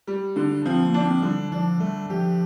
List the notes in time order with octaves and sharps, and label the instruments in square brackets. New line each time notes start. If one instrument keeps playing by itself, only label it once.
[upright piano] G3
[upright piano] D3 [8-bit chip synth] D4
[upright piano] F3 [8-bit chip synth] C4
[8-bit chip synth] A#3
[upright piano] D4
[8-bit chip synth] C4
[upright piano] D3 [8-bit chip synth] G3
[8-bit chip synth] F3 [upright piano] D4
[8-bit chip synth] G3 [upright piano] A3
[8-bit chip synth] F3 [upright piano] G4